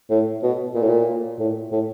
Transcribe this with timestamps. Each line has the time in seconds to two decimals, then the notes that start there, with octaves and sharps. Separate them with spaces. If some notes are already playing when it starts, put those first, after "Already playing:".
0.10 A2
0.43 B2
0.75 A#2
0.82 A2
0.89 A#2
1.39 A2
1.72 A2